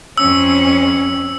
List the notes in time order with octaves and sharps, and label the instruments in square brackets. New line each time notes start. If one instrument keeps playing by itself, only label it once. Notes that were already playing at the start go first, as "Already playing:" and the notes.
[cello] F2 C#4 [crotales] E6